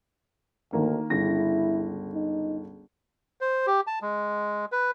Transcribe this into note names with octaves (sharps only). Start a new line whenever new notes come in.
D2 D#3 A#3
G1 C#2 E4 A#6
D#4
C5
G4
A5
G#3
B4